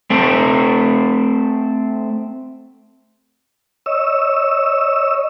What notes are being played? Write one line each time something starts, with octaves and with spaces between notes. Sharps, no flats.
A3 C4
C#5 D#5 E6